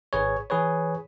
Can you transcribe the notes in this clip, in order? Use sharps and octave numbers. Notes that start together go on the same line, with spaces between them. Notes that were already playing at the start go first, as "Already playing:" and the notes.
G#1 G#4 B4 C#5
E3 G#4 B4 C#5